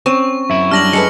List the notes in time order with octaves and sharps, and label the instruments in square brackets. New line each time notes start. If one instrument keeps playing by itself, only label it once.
[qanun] C4 [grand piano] C#4 D#7 E7 [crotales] C#6
[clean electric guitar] F#2 E4 [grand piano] E5
[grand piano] G3 D4 [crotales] F6 A#6 F#7
[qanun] G#3 A4 B4 [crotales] C#7